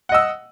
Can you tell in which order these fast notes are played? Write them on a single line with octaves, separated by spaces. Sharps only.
F#5 D#5 E6